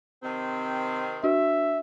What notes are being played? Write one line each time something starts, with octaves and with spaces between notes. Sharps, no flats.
C3 D#3 C4
D4 F#4 E5